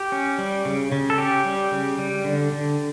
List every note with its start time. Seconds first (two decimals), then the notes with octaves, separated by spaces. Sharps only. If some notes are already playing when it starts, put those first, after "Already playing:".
Already playing: G4
0.12 C#4
0.38 G3
0.65 C#3
0.92 C#3
1.10 A4
1.18 C#4 G4
1.45 G3
1.72 C#3
1.99 G3
2.24 D3
2.52 D3